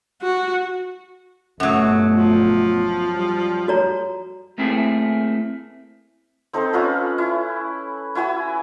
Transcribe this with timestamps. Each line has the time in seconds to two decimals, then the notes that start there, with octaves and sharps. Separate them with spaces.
0.22 F#4
1.60 G1 F#2 B2 F#3 A3
2.12 F3
3.12 G3
3.68 F#4 C#5 A#5
4.58 A3 A#3 C4 E4 G#4 A4
6.53 C4 D#4 A4 C5
6.73 C#4 D#4 F4 B4
7.18 E4
8.15 E4 F#4 G#5 E6